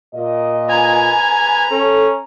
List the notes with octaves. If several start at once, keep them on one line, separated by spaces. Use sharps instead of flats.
A#2 D#5
B4 G#5 A#5
C#4 A4